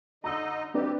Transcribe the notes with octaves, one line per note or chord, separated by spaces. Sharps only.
D3 D#4 D#5 A#5 E6
D2 C4 D4 G4 B4